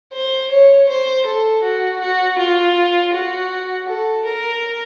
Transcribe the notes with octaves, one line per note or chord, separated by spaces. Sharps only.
C5
C#5
C5
A4
F#4
F#4
F4
F#4
A4
A#4